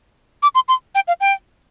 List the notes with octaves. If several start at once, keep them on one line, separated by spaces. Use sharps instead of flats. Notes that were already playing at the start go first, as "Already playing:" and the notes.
D6
C6
C6
G5
F5
G5